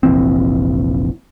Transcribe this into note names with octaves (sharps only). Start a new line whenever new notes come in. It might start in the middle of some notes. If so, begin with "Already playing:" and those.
F1 A#1 E3 C4